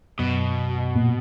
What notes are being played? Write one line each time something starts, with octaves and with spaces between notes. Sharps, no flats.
F#2 B2
A#2